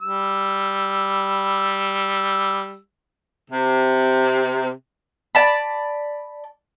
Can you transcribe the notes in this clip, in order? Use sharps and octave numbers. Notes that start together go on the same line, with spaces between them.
G3 E6
C3
D5 A5 B5